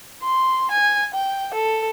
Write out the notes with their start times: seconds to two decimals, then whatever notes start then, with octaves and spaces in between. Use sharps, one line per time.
0.23 C6
0.71 G#5
1.14 G5
1.54 A4